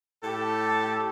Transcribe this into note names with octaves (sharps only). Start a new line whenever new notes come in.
A2 G4 A4